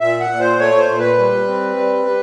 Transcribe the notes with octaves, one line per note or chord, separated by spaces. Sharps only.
A#2 E5
F#5
A#2
C5
A3 C#5
C5
A#2
B4
G3
C4
G3
G3